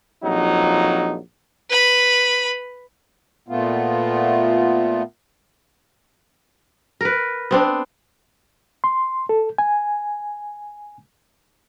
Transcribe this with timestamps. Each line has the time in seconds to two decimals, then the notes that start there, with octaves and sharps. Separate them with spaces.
0.24 A#1 F2 F#3 D#4
1.70 B4 B5
3.48 A#2 A3 B3 F4
7.01 A#4 B4
7.51 B3 C4 D4
8.84 C6
9.29 A4
9.58 G#5